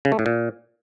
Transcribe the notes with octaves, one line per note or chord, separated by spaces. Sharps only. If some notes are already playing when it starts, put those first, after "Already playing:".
C#3
A3
A2
A#2